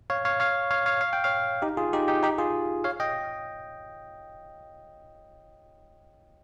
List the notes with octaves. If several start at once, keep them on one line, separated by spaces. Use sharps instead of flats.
C#5 F5
C#5 F5
C#5 F5
C#5 F5
C#5 F5
F5
G5
C#5 F5
D#4 G4
F4 G#4
D#4 G4
D#4 G4
D#4 G4
F4 G#4
C#5 F5
D#5 G5